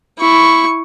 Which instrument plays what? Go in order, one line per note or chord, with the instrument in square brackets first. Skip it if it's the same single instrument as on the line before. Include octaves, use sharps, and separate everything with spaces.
[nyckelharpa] E4 C#6